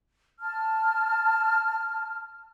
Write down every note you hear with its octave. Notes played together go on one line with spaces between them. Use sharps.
A5 F6